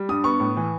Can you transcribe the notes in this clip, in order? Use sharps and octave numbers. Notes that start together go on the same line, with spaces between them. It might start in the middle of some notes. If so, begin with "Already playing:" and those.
Already playing: G3
G2 D#6
B3 C#6
A2
E3